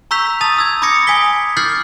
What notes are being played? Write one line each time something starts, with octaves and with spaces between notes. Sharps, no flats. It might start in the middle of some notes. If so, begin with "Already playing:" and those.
A#5 C#6 E6 G6 B6 F7
A5 D#6 A6 F7
A5 E6 G#6
B5 D6 D#6 G#6 A#6 C#7
G#5 D#6 G#6 B6 G7
D6 F6 G6 A6 C7 F#7